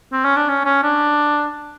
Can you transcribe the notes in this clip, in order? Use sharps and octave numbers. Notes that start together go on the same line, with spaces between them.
C4
C#4
D4
C#4
C#4
D4